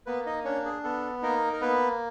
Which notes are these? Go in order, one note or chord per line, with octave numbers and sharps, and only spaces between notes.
A#3 B3 B4
D#4 D#5
C#4 D4 C#5
G#4
B3 A4
A#3 D#4 A#4
A#4
A#3 B3 B4